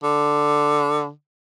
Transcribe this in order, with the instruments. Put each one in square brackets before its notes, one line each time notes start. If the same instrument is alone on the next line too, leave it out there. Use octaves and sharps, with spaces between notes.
[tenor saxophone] D3